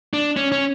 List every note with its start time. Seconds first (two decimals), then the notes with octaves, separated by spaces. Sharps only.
0.14 D4
0.37 C#4
0.52 C#4